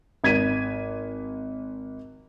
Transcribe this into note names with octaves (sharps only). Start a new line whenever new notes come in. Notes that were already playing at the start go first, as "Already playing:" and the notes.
G#1 G#6 B6 D#7